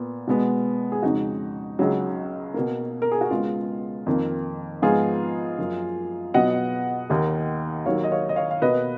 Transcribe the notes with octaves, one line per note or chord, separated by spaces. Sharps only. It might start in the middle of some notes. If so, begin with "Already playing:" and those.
Already playing: A#2 B3
B2 G#3 B3
G#4
F2 C#3 G#3 D#4 F#4
C#2 C#3 F#3
B2 A#3
A#4
G#4
F#4
C#2 C#3 G#3 B3 F4
F2 D#3 A#3
G#2 F3 B3 F4 G#4
F#2 F3 A#3
B2 F#3 B3 D#5 F#5
D#2 D#3 A#3
D#2 D#3 F#3 A#3 C#5 F5
D#5
C#5 F5
D#5
C#5 F5
F5
B2 A#3 B4 D#5